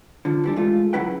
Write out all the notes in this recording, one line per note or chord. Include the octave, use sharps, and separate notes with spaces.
D3 F3
E3 G3 D4
G#2 A3 F4
C#3 F#3 E4 B4 F#5 G5